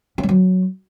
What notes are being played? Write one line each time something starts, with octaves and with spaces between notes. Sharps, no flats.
C#4
A3
F#3